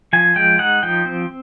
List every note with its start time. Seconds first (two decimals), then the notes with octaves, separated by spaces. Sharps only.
0.13 F3 G#5
0.36 G#3 G5
0.59 D#4 F#5
0.83 F3 G5
1.05 C4